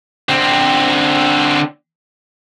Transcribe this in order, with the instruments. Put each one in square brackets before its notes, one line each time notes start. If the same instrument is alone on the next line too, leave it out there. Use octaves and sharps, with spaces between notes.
[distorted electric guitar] D3 C4